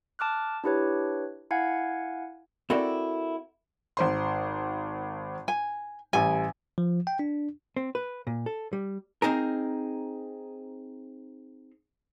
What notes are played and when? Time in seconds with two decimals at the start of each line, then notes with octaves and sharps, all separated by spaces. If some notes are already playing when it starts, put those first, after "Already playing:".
0.19 A5 D6 F6 F#6
0.64 D4 E4 G4 B4 C#5
1.51 E4 F5 F#5 G#5 G#6
2.70 C4 E4 F#4 A4 A#4 D5
3.97 G#1 C5 C6
5.48 G#5
6.13 A1 G3 G#5
6.78 F3
7.07 G5
7.19 D4
7.76 C4
7.95 B4
8.27 A#2
8.46 A4
8.73 G3
9.22 C4 D#4 G#4 A#4